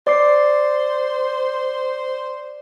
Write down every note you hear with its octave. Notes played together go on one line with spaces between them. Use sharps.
C5 D5 D6 C7